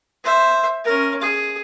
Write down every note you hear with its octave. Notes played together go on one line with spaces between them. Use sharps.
C5 E5
C#4 A#4
G#4